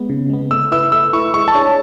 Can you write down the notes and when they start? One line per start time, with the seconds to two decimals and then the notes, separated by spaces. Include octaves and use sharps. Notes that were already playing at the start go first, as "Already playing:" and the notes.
Already playing: G#3 B3
0.10 C#3
0.30 G#3 B3
0.51 A3 E6
0.72 E4 B4 E6
0.92 A3 E6
1.13 E4 B4 C#6
1.34 G#3 C#6
1.48 A5
1.55 D4 G#4 C#5